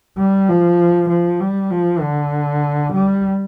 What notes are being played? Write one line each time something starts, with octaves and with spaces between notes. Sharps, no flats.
G3
F3
F3
G3
F3
D3
G3